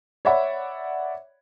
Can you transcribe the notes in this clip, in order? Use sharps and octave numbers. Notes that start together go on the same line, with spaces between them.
C#5 D5 E5 F#5 B5